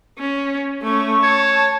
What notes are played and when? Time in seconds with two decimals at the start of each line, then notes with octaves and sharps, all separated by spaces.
0.18 C#4
0.83 A3 C#4 C#6
1.23 C#5 A5